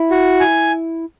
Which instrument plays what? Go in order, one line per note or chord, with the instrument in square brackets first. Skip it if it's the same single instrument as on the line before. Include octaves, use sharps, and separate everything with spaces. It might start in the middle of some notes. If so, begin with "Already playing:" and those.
Already playing: [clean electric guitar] E4
[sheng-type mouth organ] F#4
G#5